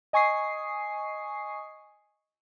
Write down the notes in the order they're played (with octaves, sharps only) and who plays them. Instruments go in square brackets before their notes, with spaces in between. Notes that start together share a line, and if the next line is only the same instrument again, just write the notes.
[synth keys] D#5 G#5 C#6 D#6 C7